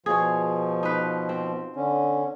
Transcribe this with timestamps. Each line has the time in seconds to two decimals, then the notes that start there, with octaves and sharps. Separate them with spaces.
0.06 B2 F3 G#4 C#5
0.83 D#4 B4
1.29 C4
1.76 D3 C#4